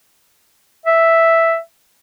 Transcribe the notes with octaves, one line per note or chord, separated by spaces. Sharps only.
E5